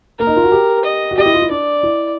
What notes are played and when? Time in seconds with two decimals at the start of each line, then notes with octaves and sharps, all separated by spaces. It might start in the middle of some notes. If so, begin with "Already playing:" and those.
0.19 A#3 A#4
0.27 D#4
0.36 F4
0.44 F#4
0.52 G4
0.85 D#5
1.11 F#4
1.18 G4 D#5
1.26 E4
1.34 F4
1.42 E4
1.50 D4 D5
1.83 E4